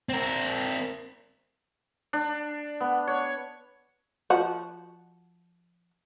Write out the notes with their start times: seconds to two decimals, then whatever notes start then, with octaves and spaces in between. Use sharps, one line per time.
0.09 C4 A#4
2.13 D4
2.80 B3
3.07 C#5
4.30 F3 F#4